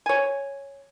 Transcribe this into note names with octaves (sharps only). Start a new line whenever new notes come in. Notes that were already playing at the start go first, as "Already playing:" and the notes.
C#5 G#5